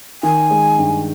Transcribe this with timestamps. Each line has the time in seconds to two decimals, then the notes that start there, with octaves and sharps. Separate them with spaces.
0.23 D#3 G#5
0.51 G#3
0.79 G2